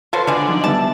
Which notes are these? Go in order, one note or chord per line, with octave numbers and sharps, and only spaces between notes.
F3 F#3 F4 A4 B4 C5
B2 D3 G#3
F3 F#3 D#4
G3 B3 E5 A5